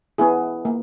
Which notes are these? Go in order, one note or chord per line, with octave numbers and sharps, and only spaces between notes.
B3 E4 G#4
A#3